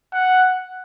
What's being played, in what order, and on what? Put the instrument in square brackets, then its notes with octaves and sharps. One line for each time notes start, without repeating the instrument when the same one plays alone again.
[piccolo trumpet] F#5